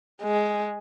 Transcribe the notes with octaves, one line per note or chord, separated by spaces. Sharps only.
G#3